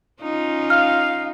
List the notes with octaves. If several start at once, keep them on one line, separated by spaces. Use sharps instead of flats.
C#4 D#4 F4
F5 F6